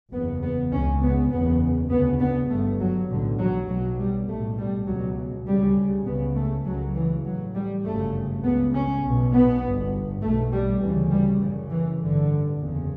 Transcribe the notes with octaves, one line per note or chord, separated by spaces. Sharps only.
F#1 E2 C#3 B3
B3
C#2 C#3 C#4
B3
F#1 E2 C#3 B3
D2 C#3 B3
B3
G1 G2 A3
F#3
B1 A2 D3
F#3
B1 B2 F#3
G3
B1 A2 A3
G3
C#2 B2 F#3
D2 C#3 G3
C#2 C#3 B3
A3
C#2 C#3 F#3
E3
A1 A2 F#3
G3
G1 F#2 C#3 A3
C#2 C#3 B3
C#4
B1 B2
B3
G1 G2
B1 B2 A3
G3
D2 C#3 E3
G3
F#1 F#2 C#3 E3
E3
A1 G2 D3
F#1 E2 C#3